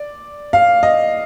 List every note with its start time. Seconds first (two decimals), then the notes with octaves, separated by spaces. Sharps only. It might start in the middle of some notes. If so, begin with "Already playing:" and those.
Already playing: D5
0.53 F5
0.83 D#5